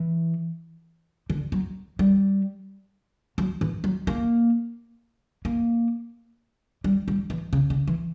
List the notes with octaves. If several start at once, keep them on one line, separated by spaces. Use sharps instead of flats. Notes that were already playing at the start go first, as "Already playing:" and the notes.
Already playing: E3
D3
F#3
G3
F#3
E3
F#3
A#3
A#3
G3
G3
E3
C#3
C#3
E3